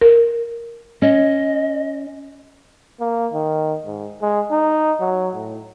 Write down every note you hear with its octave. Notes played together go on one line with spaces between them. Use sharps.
A#4
C#4 D#5
A#3
D#3
G#2
G#3
D#4
F#3
A2